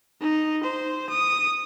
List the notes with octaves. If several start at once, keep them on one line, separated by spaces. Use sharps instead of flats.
D#4
C5
D#6